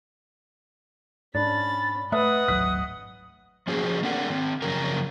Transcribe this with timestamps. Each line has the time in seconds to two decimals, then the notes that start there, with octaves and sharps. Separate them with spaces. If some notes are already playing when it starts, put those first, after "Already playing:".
1.35 G#2 C#4 D4 B5 A6
2.12 A3 B4 D#5 E5 F#5 D#6
2.48 D1 G#1 F#3 F#6 B6
3.67 F3 C#4 F#4 G#4 C5
4.03 A3 C4 D4 A#4 F#5
4.30 D#3 C4
4.62 F#2 C#3 F3 A#4 A#5